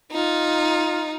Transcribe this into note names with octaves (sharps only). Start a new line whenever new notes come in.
D#4 F4